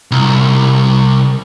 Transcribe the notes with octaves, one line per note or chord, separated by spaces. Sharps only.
C2